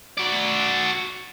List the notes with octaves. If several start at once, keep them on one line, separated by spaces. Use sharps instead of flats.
F#4 D5